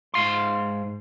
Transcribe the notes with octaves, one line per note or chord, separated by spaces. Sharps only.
G#2 F5 C6